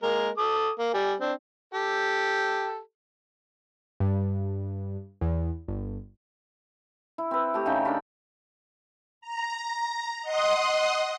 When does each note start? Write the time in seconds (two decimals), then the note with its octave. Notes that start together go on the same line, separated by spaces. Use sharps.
0.03 G#3 A#3 A#4
0.38 A4 D6 D#6
0.79 A#3
0.94 G3 G#5
1.20 C4 D4
1.74 G4 A4
4.00 G2
5.21 E2
5.68 G1
7.18 E4
7.31 C4 B4
7.54 A3 G4
7.66 C#3 D#4 G5
7.85 D4 A#4 B5
9.21 A#5
10.22 D#5 F#5 C6 D#6